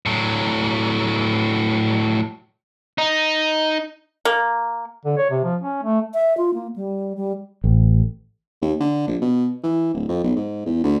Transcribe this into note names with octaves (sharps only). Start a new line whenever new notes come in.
A2 F#3
D#4
A#3
D3
C#5
C3
F3
C#4
A3
E5
F4
A#3
G3
G3
A1
D#2
D3
A#1
B2
E3
D1
F2
B1
G#2
E2
D2